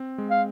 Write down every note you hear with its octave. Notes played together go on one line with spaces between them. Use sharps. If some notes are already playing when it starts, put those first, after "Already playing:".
Already playing: C4
G#3
F5